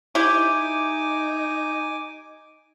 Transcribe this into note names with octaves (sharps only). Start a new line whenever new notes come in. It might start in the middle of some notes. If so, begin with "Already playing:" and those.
D#4 E4 G4 G#5 D6